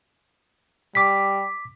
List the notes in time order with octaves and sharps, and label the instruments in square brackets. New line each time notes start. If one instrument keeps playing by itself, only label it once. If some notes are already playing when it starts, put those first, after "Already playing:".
[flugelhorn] G3 [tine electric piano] D6 B6